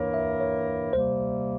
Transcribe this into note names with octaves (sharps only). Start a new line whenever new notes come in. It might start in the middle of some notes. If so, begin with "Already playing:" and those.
Already playing: G2 E3 A#3 E4 A#4 C#5
E5
C#5
C3 G3 A#3 C5